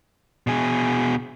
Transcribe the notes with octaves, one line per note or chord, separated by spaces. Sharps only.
B2 G#4